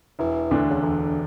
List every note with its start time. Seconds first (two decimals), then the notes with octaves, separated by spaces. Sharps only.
0.19 E1 E3
0.51 D2 D3 A3 D4
0.70 C#3
0.82 E1 D3